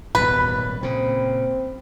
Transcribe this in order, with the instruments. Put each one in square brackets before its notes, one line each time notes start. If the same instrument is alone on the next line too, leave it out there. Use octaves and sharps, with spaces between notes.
[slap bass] D#1 B1 G#2 [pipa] B4 [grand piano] B5
[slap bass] A#2 C#3 [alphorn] C4